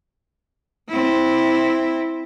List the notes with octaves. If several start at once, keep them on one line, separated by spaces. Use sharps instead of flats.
C4 E4